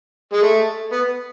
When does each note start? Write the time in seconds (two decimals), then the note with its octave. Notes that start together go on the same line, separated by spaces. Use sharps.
0.33 G#3
0.42 A3
0.92 B3